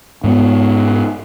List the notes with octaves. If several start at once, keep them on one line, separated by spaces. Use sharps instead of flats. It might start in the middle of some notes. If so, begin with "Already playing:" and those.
G#2 G#3 B3